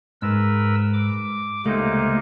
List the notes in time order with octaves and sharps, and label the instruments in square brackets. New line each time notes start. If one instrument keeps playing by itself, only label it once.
[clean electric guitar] G#2 [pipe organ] A#4 B4 E6
[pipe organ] D6
[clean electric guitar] C#2 A3 [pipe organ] C3 A#3 D#4